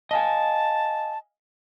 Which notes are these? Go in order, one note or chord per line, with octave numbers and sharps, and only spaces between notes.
D#5 F5 G#5 A5